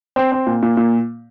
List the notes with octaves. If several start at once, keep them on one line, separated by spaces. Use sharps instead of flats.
C4
C4
A#2
A#2
A#2